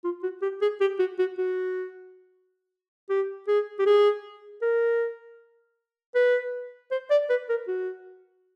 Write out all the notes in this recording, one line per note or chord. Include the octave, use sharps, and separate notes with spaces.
F4
F#4
G4
G#4
G4
F#4
F#4
F#4
G4
G#4
G4
G#4
A#4
B4
C5
D5
B4
A#4
F#4